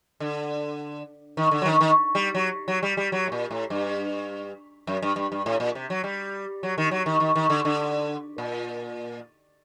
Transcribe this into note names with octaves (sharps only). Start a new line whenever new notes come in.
D3
D#3
D3
F#3
D#3
D#3
G3
F#3
F#3
G3
G3
F#3
A2
A#2
A2
G2
F#2
G2
G2
G2
A2
A#2
C3
F#3
G3
F#3
D#3
F#3
D#3
D#3
D#3
D3
D3
A#2